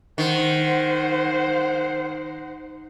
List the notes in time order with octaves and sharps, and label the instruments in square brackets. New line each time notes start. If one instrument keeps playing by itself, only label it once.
[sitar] D#3 [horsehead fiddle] C5 F#5